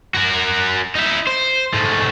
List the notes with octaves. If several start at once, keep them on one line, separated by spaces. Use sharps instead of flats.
F#4 A#4
D#4 E4
C5
G#2 A3